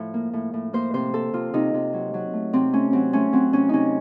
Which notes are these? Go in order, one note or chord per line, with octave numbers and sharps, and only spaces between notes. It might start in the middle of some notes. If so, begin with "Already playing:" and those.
Already playing: A2 F3
A#3
A2
A2
A#3 C5
C3 C5
A#3 A4
C3 F4
C3 D#4
C3
F#3
F#3
A3
C3 C4
A3 C#4
F#3 C4
A3 C#4
F#3 C4
C3 C#4
C3 C#4 D#4